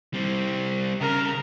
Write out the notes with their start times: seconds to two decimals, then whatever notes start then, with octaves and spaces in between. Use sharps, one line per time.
0.14 G3 C4
1.01 C#3 A#4